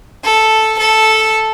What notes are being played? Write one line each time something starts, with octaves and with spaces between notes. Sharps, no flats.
A4
A4